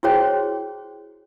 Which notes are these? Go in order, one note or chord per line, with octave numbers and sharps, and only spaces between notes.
E4 F#4 G#4 C5 C#5 G5